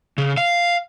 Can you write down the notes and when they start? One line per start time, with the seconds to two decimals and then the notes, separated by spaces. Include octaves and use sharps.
0.18 C#3
0.37 F5